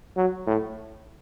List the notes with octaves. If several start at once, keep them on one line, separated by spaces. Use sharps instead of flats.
F#3
A2